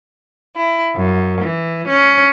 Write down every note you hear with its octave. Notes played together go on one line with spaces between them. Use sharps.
E4
F#2
E3
C#4